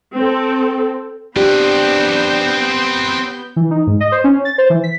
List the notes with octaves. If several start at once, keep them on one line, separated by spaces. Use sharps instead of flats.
C4 A4
B3 C4 D4 G4 B4 G6
E3
D#4
G#2
D#5
C5
C#4
A6
C5
E3
B6